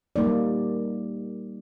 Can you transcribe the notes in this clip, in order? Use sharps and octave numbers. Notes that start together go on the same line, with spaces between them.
G3 A#3 D#4 D5